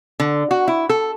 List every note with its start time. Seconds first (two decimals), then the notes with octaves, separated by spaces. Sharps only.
0.20 D3
0.51 F#4
0.68 E4
0.89 A4